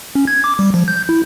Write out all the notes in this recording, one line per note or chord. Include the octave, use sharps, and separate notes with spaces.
C#4
G#6
D6
G3
F3
G6
E4